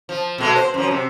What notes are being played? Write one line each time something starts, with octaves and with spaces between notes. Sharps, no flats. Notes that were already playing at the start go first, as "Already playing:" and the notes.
F3
B2 G#3 A3
C5
F#2 F3
C3